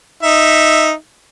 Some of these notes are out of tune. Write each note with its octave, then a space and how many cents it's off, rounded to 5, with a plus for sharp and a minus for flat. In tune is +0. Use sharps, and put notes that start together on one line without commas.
D#4 +0 E5 +0